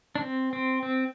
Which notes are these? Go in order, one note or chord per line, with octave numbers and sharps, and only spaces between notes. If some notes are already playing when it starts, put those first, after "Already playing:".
D4
C4
C4
C4